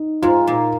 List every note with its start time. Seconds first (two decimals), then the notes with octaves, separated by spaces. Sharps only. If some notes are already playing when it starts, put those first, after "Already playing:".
Already playing: D#4
0.22 G#2 G#3 F4
0.47 A#2 A#3